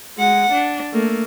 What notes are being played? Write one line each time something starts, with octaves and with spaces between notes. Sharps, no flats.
G#3 F#5
D4
A3 A#3